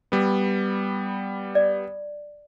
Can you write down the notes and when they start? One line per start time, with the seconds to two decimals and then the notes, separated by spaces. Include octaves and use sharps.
0.12 G3 B3
1.55 D5